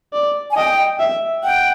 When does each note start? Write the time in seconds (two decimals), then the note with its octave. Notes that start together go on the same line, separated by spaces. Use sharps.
0.13 D5
0.50 G#5
0.57 D#5 G5
1.00 E5
1.43 F#5 G5